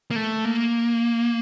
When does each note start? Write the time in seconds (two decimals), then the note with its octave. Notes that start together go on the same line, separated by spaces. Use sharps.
0.11 A#3
0.16 A3
0.45 A#3